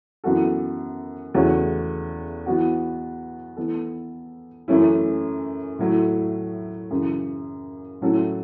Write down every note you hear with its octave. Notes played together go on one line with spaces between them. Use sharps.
F#2 E3 B3 F#4 A4
E2 C#3 A3 F#4 C#5
E3 B3 F#4
E3 B3 A4
F#2 E3 A3 C#4 E4
A2 F#3 A3 E4
F#2 C#3 E3
A2 F#3 C#4 E4 A4